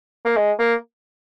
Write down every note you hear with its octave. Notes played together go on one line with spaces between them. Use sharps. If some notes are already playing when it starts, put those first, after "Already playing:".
A#3
G#3
A#3